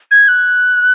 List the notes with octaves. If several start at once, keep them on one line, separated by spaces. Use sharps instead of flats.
G#6
F#6